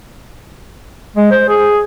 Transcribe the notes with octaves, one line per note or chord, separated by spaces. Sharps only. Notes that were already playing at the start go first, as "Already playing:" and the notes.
G#3
C5
G#4